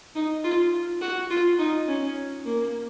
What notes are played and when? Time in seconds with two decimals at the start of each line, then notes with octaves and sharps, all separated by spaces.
0.15 D#4
0.44 F4
1.01 F#4
1.30 F4
1.59 D#4
1.88 C#4
2.45 A#3